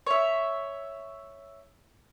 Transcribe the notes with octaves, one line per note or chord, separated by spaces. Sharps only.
C#5 E5